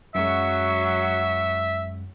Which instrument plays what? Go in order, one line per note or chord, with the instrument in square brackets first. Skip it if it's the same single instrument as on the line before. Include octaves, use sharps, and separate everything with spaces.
[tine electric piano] F#2 G#3 [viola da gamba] F#3 F#4 [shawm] E5